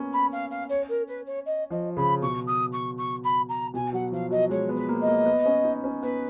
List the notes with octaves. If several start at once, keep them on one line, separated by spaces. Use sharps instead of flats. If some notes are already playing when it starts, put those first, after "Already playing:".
Already playing: A#3 B3 C#4
B5
F5
F5
C#5
A#4
B4
C#5
D#5
F3 D#5
C#3 B5
B2 C#6
D#6
C#6
C#6
B5
A#5
B2 G#5
F#3 F#5
F3 F5
F#3 D#5
G#3 C#5
B3
B4
A#3
D#5
A#3
B3
C#4
D#4
C#4
B3 B4